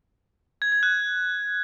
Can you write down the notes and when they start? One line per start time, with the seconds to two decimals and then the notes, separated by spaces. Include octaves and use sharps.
0.62 G#6
0.72 G#6
0.83 F#6